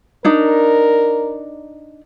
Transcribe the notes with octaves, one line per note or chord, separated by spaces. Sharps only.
D4 D#4 A#4